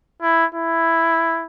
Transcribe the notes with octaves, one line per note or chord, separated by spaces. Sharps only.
E4
E4